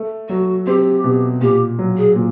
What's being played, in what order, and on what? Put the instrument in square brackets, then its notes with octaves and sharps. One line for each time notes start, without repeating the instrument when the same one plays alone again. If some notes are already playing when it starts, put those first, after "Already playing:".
Already playing: [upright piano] A3
[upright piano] F#3 [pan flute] F#4
[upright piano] C4 [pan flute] G4
[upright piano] B2
[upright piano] A#2 [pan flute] G4
[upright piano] F#3
[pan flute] G#4
[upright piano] A#2